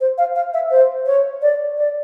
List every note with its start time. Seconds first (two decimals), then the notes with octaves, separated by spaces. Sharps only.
0.01 C5
0.18 F5
0.36 F5
0.53 E5
0.71 C5
1.06 C#5
1.42 D5
1.77 D5